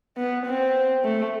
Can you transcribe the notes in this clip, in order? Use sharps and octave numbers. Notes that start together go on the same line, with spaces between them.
B3
C4
A3